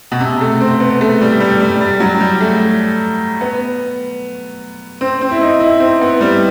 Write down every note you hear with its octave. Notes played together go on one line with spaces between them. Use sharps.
B2
C3
A3
C4
B3
A3
G3
G3
G3
G3
F#3
G3
A3
B3
C4
C4
E4
D#4
E4
C4
B3
G3